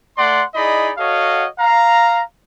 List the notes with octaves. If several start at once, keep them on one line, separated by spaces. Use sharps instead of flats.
A3 D5 F#5 C6
D#4 E4 G#4 D5 D#5 B5
F#4 A4 C#5 D#5 F5 F#5
F5 A#5